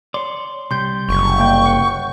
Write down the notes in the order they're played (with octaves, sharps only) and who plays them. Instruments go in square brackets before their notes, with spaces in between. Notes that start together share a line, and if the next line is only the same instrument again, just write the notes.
[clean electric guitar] C#5 D5 [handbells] C6
[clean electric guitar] C2 G3 [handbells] C6 G6
[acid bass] F#1 [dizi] C#6
[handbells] A#3 G5 G6
F#5